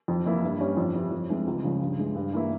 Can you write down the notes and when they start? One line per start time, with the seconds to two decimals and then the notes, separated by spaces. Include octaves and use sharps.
0.08 F2
0.26 E3 A#3 E4
0.43 G2
0.60 G3 C#4
0.77 F2
0.95 E3 G3
1.12 F2
1.30 E3 G#3 C4
1.47 C#2
1.64 C#3 F3 G#3 C#4
1.82 G2
1.98 E3 G#3
2.15 G2
2.33 E3 A#3 E4